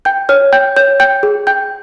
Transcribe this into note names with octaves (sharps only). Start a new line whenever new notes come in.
G5 G6
C#5 F6
G5 G6
C#5 G6
G5 G6
G#4
G5 G6